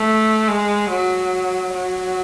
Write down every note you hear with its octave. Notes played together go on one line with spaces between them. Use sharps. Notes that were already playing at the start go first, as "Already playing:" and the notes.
Already playing: A3
G#3
F#3
F#3